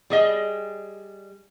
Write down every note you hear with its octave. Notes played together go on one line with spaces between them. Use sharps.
G3 G#4 D#5